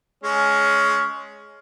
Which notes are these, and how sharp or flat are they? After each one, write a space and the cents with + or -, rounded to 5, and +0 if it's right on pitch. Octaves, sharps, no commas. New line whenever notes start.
G#3 +15 C#4 +15